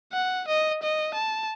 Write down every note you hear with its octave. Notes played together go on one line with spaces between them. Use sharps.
F#5
D#5
D#5
A5